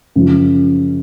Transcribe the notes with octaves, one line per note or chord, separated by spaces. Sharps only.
F#2 C#3 F3